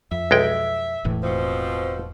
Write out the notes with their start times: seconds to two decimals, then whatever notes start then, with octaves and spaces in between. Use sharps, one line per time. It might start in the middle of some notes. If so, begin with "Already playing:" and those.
0.11 F2 E5
0.31 B1 G#3 G5
1.05 E1 A2 E3
1.22 B2 F3 C4